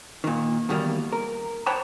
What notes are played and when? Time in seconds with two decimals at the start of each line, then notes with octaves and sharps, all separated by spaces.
0.24 A#2 D#3
0.69 E2 B2 D#3 G3 A#3
1.13 A#4
1.66 C5 C#5 F#5 G5 A5 B5